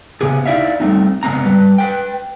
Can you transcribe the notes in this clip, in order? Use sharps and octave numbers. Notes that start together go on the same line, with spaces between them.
C#3 B3 G4 G#4
D#4 E4 D5 E5 F5
G3 A3 C4 D#4
C#3 G#3 B3 C4 A#5
G3 B4
B4 G5